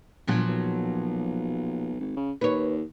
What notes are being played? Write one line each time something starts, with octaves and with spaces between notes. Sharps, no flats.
G1 A#2 F3 F#3
B1
G#1
C#3
D#2 B4 C#5